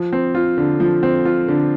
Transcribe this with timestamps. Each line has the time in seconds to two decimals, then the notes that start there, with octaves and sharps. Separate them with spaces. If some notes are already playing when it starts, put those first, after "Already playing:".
Already playing: F3
0.13 C4
0.35 F4
0.58 D3
0.80 F3
1.03 C4
1.25 F4
1.48 D3